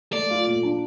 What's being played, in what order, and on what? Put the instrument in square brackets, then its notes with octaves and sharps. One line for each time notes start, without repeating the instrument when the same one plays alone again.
[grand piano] A3 [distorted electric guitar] D5
[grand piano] F4
A#2
D4